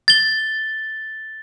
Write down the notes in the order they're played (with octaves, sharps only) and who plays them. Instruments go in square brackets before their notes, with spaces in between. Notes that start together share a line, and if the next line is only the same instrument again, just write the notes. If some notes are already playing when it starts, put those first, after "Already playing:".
[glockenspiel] A6 G7